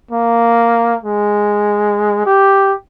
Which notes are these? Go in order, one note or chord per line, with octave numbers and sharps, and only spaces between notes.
A#3
G#3
G4